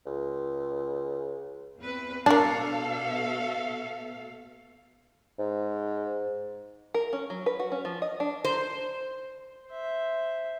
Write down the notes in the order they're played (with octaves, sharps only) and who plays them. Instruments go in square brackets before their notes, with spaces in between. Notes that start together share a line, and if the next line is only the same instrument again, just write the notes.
[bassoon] C#2
[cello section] E2 C4 B4
[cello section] B2 A4 F5 [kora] D4 [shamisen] A#4 A5
[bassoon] G#2
[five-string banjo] A#4
C#4
F#3
B4
F#4
C#4
F3
D#5
D4
[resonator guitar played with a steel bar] C5
[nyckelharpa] C5 E5